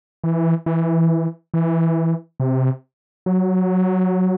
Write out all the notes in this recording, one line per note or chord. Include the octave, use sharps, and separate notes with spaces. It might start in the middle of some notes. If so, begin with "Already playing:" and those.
E3
E3
E3
C3
F#3